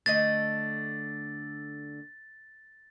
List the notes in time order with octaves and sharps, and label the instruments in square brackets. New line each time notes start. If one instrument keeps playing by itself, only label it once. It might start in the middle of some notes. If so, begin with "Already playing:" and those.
[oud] D3 A3 D#5 [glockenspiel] A6